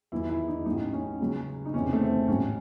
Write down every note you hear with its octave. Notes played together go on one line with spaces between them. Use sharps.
E2 D#3 F#3 E4
E4
D#4
A1 A2 F#3 D#4
C#4
C#2 C#3 F#3
D#4
E2 C3 D#3 C#4
A3
C4
A1 G#2 F#3 C#4